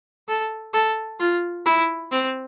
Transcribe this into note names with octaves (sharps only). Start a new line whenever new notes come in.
A4
A4
F4
E4
C4